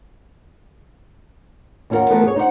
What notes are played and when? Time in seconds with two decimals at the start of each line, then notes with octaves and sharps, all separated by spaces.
1.90 D#2 C#4 E4 F4 A#4 F#5
2.10 E3 F3 A3 B3 A#4
2.24 G#4 C#5
2.36 D#4 C5 D5 F#5